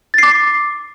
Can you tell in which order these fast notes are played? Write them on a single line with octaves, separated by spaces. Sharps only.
A6 C7 D6